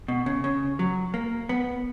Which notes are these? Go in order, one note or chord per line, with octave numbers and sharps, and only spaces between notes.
B2
C#3
C#3
F#3
A#3
B3